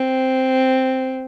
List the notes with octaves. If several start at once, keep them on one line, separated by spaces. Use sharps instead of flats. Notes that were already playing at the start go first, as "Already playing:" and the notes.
Already playing: C4